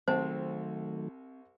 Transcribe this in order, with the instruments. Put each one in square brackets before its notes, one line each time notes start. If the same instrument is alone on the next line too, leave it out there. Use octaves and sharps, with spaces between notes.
[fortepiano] C2 A5 [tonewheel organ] D#3 F#3 A3 [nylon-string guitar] C4 [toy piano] C5